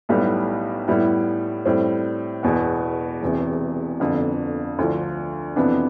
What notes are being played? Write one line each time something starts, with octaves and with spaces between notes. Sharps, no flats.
B1 A2 G3 B3
A2 G3 B3 E4
A2 G3 C4
E1 E2 B2 B3
E1 E2 C3
G1 F2 D3
D2 D3 F3
F2 C3 E3 B3 D4